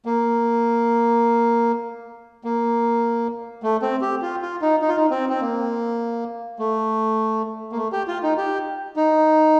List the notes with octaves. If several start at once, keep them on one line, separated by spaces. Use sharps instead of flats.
A#3
A#3
A3
C4
G4
F4
F4
D#4
D#4
F4
D#4
C4
C4
A#3
A3
A#3
A3
G4
F4
D#4
G4
D#4